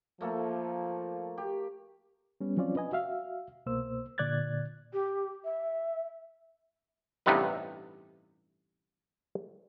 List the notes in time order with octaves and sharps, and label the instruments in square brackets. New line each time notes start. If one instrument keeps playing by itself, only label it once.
[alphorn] F3 [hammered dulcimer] A3 A#3 A4
[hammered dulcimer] G4
[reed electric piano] G3 B3 C#4
F3 F#3 C4 C#4 F4 D5
D4 B4 D#5 G#5
F#4 E5 F5
C2 B2 A#3 C5 E6
A#2 D3 D5 F#6 G#6 A6
[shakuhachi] G4
E5
[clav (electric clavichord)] A1 G2 C3 B3 D#4 B4